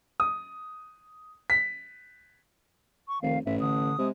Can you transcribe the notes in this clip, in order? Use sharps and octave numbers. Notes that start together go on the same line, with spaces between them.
D#6
B6
C#6
F1 D#3 F5
A1 G#2 E5
D3 D#6
C3 G#3